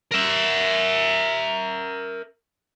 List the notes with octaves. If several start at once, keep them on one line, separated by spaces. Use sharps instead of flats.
A#4 E5